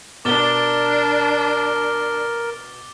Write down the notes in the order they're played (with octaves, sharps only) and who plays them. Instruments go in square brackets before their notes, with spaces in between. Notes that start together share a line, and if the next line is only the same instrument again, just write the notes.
[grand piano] B2 [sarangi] D4 [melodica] A#4 [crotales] D6 A6 G7